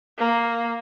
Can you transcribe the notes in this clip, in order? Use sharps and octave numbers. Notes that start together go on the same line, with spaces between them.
A#3